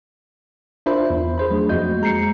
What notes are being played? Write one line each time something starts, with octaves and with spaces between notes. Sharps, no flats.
D4 F4 A#4 C5 E5 B5
E2
G#4 C5 B5
F#3 A3 D4 G#4
F2 A#3 F#4 D#5 G6
G#3 A#5 G6 C7 C#7